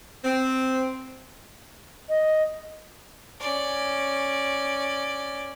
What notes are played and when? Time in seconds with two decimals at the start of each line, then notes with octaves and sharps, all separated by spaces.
0.25 C4
2.09 D#5
3.41 C#4 D5